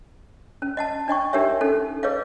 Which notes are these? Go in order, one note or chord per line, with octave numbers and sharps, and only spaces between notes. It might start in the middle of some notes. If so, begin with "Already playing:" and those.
C#4
D#5 F#5 A5
D4 D#5 G5 C#6
D4 D#4 G4 A#4 C#5 E5
C#4 D#4 A4
G#4 B4 C#5 D#5 F5